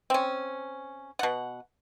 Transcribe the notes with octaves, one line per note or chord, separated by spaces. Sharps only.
C4 C#4
B2 F#5